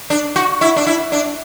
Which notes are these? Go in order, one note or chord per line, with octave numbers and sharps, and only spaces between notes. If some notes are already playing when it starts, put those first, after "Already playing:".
D4
F#4
E4
D4
E4
D4